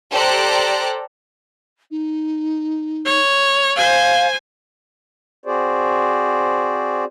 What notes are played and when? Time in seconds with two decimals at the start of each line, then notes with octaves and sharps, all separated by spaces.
0.11 G4 A4 C5 D5 A#5 F#6
1.91 D#4
3.05 C#5
3.76 C5 F5 G#5
5.46 C4 F#4 G#4 C5 D5